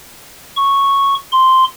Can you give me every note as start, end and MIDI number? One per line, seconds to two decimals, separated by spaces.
0.57 1.15 85
1.32 1.64 84